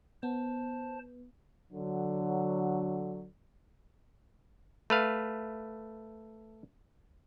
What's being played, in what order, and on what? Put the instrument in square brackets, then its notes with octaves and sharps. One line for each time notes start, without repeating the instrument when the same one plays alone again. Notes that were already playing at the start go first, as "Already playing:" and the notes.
[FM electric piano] B3 [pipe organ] C5 A5
[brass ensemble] D3 F#3
[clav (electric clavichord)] A3 B4 F5